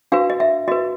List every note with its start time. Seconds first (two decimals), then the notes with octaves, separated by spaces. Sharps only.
0.12 D4 F#4 B4 F5
0.30 D#5
0.40 E5
0.68 F#4 B4 D#5